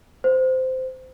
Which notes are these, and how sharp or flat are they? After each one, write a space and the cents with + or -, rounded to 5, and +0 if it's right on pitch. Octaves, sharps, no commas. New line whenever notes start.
C5 -15